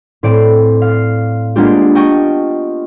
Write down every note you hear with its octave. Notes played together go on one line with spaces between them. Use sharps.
A2 C4 D5 D7
F5
G#3 A#3 B3 D4 F4 G4
D#5 G5 A5 C#6